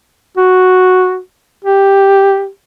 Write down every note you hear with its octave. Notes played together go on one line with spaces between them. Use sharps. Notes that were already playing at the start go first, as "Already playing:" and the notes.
F#4
G4